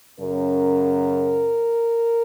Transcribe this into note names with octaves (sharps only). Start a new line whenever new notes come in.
F#2 C#3 F#3 C#4 A#4